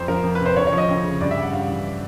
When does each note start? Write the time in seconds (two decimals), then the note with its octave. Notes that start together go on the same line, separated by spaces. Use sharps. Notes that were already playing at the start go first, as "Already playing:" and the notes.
Already playing: F2 C5
0.08 F3 A#4
0.24 F2
0.35 B4
0.40 C3
0.46 C5
0.56 D2 C#5
0.67 C#5
0.72 F3
0.78 D#5
0.88 D2
1.04 C#3
1.20 G2 D5
1.31 E5
1.37 G3
1.42 F#5
1.52 G2 F5
1.68 E3